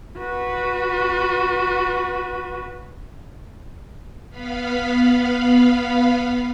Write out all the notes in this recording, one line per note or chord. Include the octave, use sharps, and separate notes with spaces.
F#4 B4
B3 F5 B5